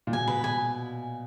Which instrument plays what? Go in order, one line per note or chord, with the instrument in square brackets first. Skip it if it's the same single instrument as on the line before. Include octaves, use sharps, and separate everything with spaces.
[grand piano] A#2
[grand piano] B2 [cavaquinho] G#5
[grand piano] B2 [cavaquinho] B4
[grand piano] B2 [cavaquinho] G#5